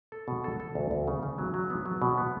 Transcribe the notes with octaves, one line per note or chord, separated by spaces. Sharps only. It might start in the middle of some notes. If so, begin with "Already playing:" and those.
A4
B2
A4
A4
D2
D2
C#3
C#3
F#3
F#3
B3
F#3
B2
B3